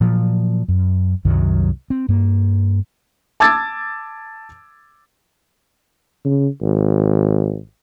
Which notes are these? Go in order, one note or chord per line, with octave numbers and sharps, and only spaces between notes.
A#2 F3 F#3
F#2
C2 F#2 D#3 F#3
C4
G2 A#3
A5 D6 E6 G#6 A6
C#3
G#1